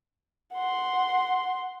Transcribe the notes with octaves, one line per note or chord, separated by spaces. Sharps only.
F#5 C6